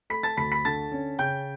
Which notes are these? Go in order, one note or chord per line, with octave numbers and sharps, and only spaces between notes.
A3 B5 B6
A5 A6
D2 B5 B6
B5 B6
D3 A5 A6
C#4
C#3 G5 G6